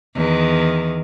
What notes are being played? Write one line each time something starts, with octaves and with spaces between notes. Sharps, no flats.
E2 D#3